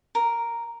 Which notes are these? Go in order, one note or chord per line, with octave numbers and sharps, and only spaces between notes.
A#4